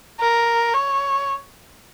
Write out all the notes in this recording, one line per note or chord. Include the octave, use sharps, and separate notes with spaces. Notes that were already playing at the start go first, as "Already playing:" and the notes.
A#4
C#5